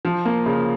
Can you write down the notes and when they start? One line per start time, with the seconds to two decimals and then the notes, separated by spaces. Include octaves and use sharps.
0.05 F3
0.25 A#3
0.46 C#3